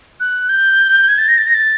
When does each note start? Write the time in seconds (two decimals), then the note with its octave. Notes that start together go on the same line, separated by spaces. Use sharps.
0.20 F#6
0.49 G6
1.08 G#6
1.18 A6
1.29 A#6
1.38 A6
1.47 A#6
1.54 A6